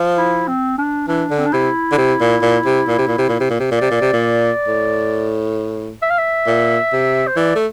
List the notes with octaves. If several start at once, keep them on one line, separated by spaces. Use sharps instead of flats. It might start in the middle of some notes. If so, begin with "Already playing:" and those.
Already playing: F3
E4
C4
D4
E3 D4
D3
C4
D4
C3 E4
D3
C3
A#2
A#2
C3
A#2
C3
A#2
C3
A#2
C3
A#2
C3
A#2
C3 D5
A#2
C3
A#2
A2
E5
F5
E5
A#2
C3
C5
E3 D5
A3